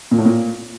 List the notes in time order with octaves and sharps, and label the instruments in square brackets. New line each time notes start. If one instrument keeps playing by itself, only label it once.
[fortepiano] A#2
A2
A#2